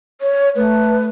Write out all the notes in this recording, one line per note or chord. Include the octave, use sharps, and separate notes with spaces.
C#5
A3 B4